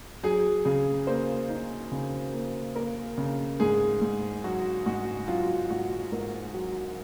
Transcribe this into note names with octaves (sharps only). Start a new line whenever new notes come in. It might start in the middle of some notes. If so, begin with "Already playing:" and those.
F#3 G#4
C#3 G#4
A#3 C5
D#4
C#3
A#3
A#3 A#4
C#3
G#2 G#4
G#2
F#3 F#4
G#2 F#4
F#3 F4
G#2 F#4
G#2 A#4
F#3